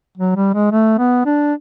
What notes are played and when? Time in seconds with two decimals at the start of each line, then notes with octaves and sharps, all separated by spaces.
0.18 F#3
0.36 G3
0.54 G#3
0.72 A3
0.98 B3
1.26 D4